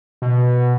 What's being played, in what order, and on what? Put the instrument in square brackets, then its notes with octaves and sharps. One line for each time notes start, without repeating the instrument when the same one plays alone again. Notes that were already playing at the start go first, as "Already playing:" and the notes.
[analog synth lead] B2